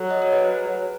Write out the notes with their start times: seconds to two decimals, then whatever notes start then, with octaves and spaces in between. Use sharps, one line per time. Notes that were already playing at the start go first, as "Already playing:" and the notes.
Already playing: F#3 A4
0.11 D#5
0.22 C#5
0.32 G#4 B4